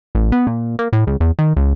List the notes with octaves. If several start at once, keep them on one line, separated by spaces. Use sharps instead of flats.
A1
B3
A#2
A#3
A2
C#2
E2
D#3
C#2